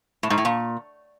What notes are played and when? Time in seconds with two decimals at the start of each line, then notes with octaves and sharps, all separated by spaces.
0.23 A2
0.30 G#2
0.38 A2
0.45 A#2